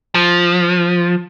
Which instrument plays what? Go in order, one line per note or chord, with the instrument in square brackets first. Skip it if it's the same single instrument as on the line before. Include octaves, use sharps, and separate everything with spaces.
[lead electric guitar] F3